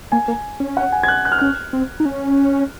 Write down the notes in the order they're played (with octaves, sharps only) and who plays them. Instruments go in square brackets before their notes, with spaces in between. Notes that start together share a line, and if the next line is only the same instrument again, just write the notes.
[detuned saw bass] A#3 [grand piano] G#5
[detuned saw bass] A#3
C#4
[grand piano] F#5
G#5
G#6
F#6
F#6
F6
[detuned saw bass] C#4 [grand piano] F#6
[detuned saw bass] C4
D#4
C#4